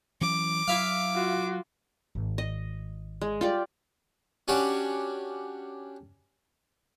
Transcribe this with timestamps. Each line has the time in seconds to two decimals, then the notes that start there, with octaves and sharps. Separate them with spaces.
0.21 E3 F#3 C#4 D6
0.68 F#3 E4 E5 F5
1.15 F4 F#4
2.15 G#1
2.38 D#5
3.21 G#3
3.41 G3 F4 G4 D5
4.48 C#4 D4 F#4 G4 C#5